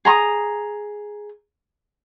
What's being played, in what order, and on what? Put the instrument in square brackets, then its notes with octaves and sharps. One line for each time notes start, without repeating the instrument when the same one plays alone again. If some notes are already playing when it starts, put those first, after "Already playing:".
[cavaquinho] G#4 A#5 C6 D#6